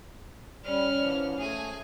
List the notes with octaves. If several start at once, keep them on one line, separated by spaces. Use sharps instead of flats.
G3 C#4 F6
G#2 E3 F3
A3 G#4 G#5